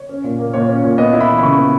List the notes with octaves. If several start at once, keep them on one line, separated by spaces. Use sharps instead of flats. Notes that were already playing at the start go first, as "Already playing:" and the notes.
Already playing: C#5
C#4
A#2
A#3
A#2 C#5
C#4
A#2
B3 D#5
E4
B5
E3
B5
C#3 C#6
B3